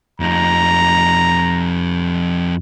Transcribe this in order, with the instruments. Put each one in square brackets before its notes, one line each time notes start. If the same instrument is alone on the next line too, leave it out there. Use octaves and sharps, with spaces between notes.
[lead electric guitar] F2 D#4 [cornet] A#5